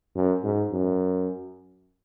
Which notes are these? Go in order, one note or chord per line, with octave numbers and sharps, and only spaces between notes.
F#2
G#2
F#2